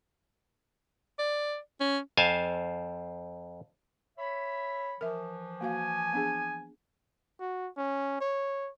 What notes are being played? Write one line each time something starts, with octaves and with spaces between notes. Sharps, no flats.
D5
C#4
F2 C5 F5 G#5 A5
C#5 E5 B5
E3 F3 A#4 E5
A#3 F#4 F5 G#5
B3 D4 G#4
F#4
C#4
C#5